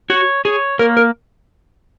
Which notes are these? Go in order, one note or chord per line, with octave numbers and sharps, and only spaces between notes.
F#4 C#5
G#4 C#5
A#3 A#4
A#4